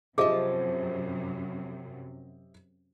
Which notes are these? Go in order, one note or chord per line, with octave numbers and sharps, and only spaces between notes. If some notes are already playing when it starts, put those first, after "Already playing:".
F#2 C3 F3 G4 G#4 D#5 E5 A5